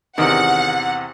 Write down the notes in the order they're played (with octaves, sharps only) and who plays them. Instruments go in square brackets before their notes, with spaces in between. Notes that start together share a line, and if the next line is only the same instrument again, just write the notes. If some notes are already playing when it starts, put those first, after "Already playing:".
[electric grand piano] E2 C3 [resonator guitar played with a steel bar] D#3 [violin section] F#5